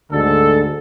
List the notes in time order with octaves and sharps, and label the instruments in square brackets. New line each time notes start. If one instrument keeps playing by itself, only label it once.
[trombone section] D2 G#2 D3 [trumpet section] A4